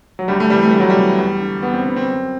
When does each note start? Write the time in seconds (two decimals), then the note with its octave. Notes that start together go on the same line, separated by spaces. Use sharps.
0.19 F#3
0.28 D2 G3
0.40 A3
0.50 C3 E3 G3
0.63 A3
0.71 D2 G3
0.80 F#3
0.90 G3
0.95 C3 E3
1.19 E2
1.40 D3
1.63 E2 B3
1.74 C4
1.85 D3 B3
1.96 C4
2.08 F#2